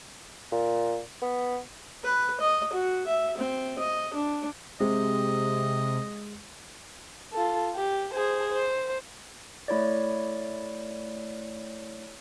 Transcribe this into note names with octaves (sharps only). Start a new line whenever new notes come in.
A#2
B3
B4
D#5
F#4
E5
C4
D#5
D4
C3 G#3 D#5
F4 A4
G4
G#4 C5
C5
A3 E4 C#5 D5